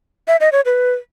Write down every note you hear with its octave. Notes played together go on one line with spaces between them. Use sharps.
E5
D#5
C#5
B4